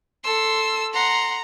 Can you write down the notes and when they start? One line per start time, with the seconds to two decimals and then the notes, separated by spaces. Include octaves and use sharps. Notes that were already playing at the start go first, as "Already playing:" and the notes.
0.24 A4 C6 E6
0.93 F#5 A#5 C6